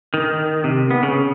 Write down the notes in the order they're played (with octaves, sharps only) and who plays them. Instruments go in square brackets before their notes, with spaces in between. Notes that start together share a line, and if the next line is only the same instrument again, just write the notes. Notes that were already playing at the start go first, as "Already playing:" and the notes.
[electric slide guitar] D#3
C3
B3
C#3